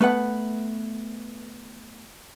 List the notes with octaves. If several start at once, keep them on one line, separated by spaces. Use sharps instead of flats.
A3 B3 B4 F#5